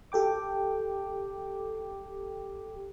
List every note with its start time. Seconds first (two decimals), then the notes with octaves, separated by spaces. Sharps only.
0.12 G4 A4 G5 D6